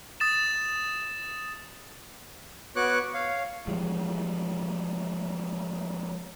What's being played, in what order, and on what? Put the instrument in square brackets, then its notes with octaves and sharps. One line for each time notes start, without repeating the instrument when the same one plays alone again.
[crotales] D#6 A6 E7
[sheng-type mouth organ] B3 F#4 C#5 C#6 D6 F#6
C#5 F5
[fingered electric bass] E3 F3 G3 G#3